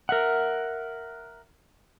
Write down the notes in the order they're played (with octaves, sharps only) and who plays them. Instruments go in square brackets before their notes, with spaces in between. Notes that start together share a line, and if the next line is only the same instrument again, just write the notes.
[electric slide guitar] A#4 E5 F#5